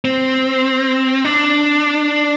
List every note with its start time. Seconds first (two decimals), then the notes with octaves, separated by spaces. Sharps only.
0.05 C4
1.25 D4